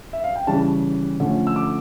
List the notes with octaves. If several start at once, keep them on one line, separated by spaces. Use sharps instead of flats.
E5
F5
G5
C#3 E3 G3 A5
D3 F3 A3 C#4
E6
D6